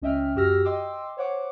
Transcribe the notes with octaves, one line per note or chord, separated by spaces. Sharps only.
C#2 C#4 D#5 E5 G5 F6
F#2 F#4 G4 E6 F6 A#6
D#5 G5 C6 D6 E6
C5 C#5 F#5 D6